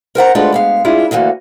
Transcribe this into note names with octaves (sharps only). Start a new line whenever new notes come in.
A#4 C5 F#5 A#5
G#3 A3 D4 F4 F#4 B4
G#3 B3 F5
G#3 D4 E4 F4 G#4
D2 D3 E3 A#3 F#4